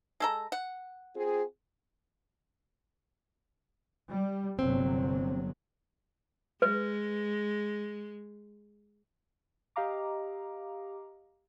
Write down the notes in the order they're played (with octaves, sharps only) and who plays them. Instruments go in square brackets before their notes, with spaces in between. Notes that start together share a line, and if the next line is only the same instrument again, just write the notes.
[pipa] G#3 A4 A#5
F#5
[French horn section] C4 F4 G#4
[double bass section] G3
[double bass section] G1 C3 F#3 [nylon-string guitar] C4
[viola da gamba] G#3 [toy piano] B4
[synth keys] G4 D#5 F5 A#5 D6